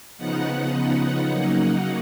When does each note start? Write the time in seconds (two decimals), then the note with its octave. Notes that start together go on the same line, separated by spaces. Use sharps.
0.18 C#3 F3 B3 D#4 F#5
0.73 F#5
1.28 C#3 F#3 A#3 D#4